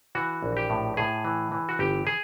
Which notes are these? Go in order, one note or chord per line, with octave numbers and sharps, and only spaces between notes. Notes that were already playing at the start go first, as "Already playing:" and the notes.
E3 F#4
A#1
G4
A2
A2 G#4
E3
E3
F#4
G1 G4
G#4